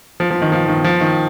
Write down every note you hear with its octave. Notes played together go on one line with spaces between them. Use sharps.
F3
F3
D#3
F3
D#3
F3
D#3